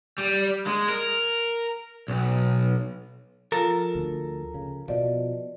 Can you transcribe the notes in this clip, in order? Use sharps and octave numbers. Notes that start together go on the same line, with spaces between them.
G3
G#3
A#4
B1
F3 F4 A4 A#4
D2
C#3
B2 F3 D5 D#5